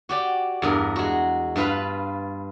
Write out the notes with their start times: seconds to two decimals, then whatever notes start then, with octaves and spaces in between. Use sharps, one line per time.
0.09 F#4 G4 D5
0.62 E2 G2 A#4
0.96 G#3 F#4
1.56 G2 F4 B4 F5 B5